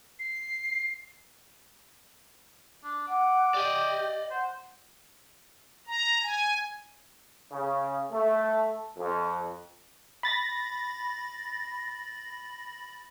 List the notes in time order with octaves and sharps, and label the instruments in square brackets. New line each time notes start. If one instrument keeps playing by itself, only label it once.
[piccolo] C7
[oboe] D4
[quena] F#5 [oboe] D6
[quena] G4 [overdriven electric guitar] D5 D#5
[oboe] C5 [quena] F#5
[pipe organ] A#5
G#5
[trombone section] C#3
A3
F2
[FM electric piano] B5 A6 A#6